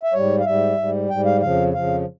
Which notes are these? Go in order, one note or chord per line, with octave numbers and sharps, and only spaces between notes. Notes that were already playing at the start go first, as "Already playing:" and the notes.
E5
G#2 G3 C#5
F5
G#2 G3 E5
G#2 G3
G#2 G3 G5
F5
F2 C#3 F3 F5
F2 C#3 F3 F5